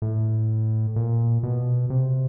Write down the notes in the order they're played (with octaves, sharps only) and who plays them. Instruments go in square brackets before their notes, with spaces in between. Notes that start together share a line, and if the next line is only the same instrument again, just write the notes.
[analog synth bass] A2
A#2
B2
C3